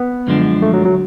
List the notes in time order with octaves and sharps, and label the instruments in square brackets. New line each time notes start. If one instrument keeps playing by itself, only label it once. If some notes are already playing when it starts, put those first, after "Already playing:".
Already playing: [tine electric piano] B3
[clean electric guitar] F#2 D3 F3 G#3 D4
[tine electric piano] A3
F#3
F#3